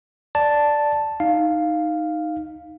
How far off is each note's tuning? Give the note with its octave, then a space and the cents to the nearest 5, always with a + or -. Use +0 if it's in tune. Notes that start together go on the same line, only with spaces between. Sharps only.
D5 +0 A5 +0
D#4 +0 F5 +0